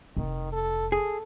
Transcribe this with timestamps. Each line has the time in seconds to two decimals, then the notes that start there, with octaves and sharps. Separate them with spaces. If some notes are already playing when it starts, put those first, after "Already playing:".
0.17 F1 D#3
0.52 A4
0.92 G#4 A4